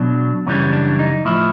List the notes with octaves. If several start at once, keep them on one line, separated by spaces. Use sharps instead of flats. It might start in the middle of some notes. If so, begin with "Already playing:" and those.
Already playing: B2 F#3 D4
F#2 C#3 E3 G3 C#4
D4
D#4
A2 F3 E4